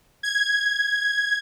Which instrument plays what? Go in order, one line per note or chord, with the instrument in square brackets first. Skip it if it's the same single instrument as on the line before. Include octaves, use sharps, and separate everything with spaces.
[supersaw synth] G#6